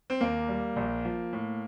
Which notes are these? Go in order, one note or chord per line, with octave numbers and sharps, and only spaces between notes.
C4
D#2 A#3
G3
A#1
F3
A2